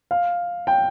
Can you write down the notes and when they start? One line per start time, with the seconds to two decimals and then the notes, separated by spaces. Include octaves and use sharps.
0.11 F5
0.67 G5